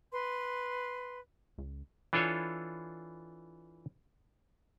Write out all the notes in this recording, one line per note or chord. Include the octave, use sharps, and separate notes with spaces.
B4 C6
C#2
E3 D4 F4 A4 C#5 G#5